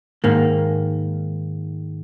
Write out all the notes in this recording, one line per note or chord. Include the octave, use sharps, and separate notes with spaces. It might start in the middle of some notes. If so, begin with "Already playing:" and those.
G#2 D#3 A#3